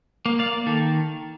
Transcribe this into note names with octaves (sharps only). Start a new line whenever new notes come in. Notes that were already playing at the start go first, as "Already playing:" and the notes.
A#3
D5 F5
D#3 A4